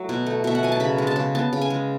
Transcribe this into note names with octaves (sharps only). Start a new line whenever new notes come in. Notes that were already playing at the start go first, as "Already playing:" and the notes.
Already playing: F#3 A3
B2
A3
B2 E5
F#5
F#3 G#5
A5
C#3 B5
G#3
A5
C#3
B3 A5
C#3
G#5
G#3